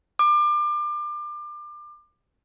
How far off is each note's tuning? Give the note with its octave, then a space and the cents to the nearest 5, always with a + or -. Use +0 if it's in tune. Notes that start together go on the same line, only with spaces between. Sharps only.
D6 +30